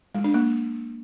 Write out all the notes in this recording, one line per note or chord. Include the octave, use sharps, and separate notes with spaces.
G#3
D4
A#3